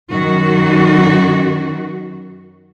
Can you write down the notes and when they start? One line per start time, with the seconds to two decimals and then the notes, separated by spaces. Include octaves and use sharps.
0.10 F#2 D#3 F#4